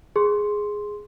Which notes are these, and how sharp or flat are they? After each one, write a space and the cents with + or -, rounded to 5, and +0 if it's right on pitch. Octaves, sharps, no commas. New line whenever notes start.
G#4 +0 C6 +0